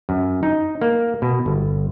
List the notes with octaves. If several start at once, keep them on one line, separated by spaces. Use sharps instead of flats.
F#2
D#4
A#3
B2
G1